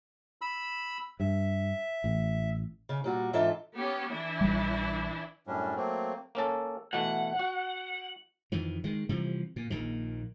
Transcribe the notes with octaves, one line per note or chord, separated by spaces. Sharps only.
B5 E6
G2 E5
A1
C#3
A#2 G3 F#4
G#2 E3 D4 F4 A4 E5
B3 C#4 G4
E3 D4 E4
A#1 G3
F#2 A2 G3 C#4 D4
F#3 A3 A#3 C4
A#3 C#4 A4
B2 E3 A3 F#5
F#4
F2 D#3 E3
D#3 G#3
C3 E3 F3 G3
A#2
A#1 A#2 D#3